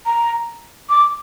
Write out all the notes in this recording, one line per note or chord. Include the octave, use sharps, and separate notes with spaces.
A#5
D6